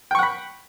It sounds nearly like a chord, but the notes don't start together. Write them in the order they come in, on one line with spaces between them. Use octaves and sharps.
G5 C#6 F#5 B5